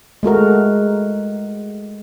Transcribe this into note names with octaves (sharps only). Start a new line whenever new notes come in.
G#3 A3 F#4 A#4